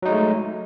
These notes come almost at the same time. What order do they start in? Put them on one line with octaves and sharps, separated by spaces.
F#3 D#4 G#3 A3